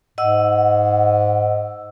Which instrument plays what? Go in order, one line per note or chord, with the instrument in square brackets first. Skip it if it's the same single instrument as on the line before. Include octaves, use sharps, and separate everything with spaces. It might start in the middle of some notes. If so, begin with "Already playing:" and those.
[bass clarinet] G#2 [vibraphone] D#5 F#5 E6